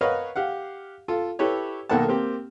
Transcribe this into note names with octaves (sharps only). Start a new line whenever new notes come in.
A#4 B4 C#5 D#5 F5 F#5
G4 F5 F#5
F4 A4
E4 G4 A4 B4 C#5
B1 D#3 A#3 A4 F#5 A5
A#3 C4 G4